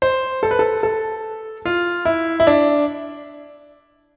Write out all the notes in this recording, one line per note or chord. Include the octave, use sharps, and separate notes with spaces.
C5
A4
B4
A4
A4
F4
E4
E4
D4